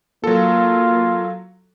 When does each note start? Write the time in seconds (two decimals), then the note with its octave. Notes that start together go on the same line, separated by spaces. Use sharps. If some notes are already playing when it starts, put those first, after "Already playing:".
0.24 F#3 A#3 F4 A4